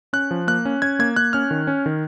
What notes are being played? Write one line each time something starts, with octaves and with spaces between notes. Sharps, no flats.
C#4 F#6
F3
A#3 F#6
C#4
C#4 G#6
A#3 G#6
A#3 F#6
C#4 F6
D#3
C#4
D#3